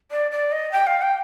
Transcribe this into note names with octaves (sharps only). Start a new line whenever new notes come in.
D5
D5
D#5
G5
F5
G5